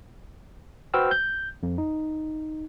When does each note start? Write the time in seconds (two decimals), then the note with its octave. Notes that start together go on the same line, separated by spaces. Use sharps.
0.94 F#4 B4 C5 G5 E6 F6
1.11 G6
1.63 F2
1.78 D#4